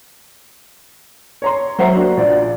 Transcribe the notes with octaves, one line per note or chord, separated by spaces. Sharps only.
C#5 A#5 C6
F#3 C5 E5 F#5 A#5 C7
A#3 D4 F#4
A#1 D5